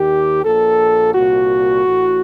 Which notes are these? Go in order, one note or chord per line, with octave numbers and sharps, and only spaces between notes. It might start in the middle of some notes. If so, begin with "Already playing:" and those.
Already playing: D#2 D#3 G4
A#1 A#2 A4
C2 A#2 F#4
A1 A2